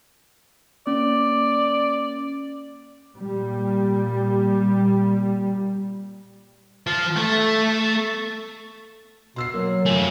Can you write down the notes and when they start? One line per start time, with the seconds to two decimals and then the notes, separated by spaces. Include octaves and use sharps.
0.87 A#3 C#4 D5 D6
3.17 A#2 G3
6.87 F3 F4
7.17 A3
9.36 B2 C6 E6 C7
9.54 F#3 A#3
9.86 A3 F4 G#5